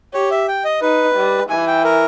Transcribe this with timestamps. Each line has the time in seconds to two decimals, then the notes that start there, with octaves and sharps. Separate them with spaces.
0.14 G4 C#5
0.31 E5
0.48 G5
0.65 D#5
0.82 D#4 B4
1.16 G3
1.50 E3 G#5
1.67 G5
1.84 A#4